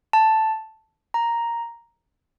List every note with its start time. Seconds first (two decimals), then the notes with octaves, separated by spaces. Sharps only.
0.13 A5
1.14 A#5